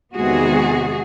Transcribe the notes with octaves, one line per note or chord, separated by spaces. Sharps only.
E2 C3 D#3 G#3 B3 F#4 G#4